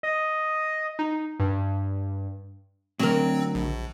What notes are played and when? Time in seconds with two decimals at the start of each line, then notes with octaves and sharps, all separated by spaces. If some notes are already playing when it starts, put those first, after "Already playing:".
0.03 D#5
0.99 D#4
1.40 G2
2.99 D2 G2 F#3 C4 A#4
3.55 A#1